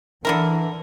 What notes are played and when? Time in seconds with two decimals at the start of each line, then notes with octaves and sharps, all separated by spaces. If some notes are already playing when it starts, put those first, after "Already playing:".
0.25 D3 E3 E4 A#4